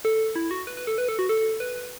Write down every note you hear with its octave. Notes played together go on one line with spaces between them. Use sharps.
A4
E4
F#4
B4
B4
A4
B4
A4
F#4
A4
B4